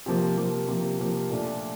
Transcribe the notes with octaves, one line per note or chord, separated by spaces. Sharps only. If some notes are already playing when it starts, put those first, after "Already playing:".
C3 F3 A#3
C3 F3 A#3
C3 F3 A#3
C3 F3 A#3
A#2 A3 D4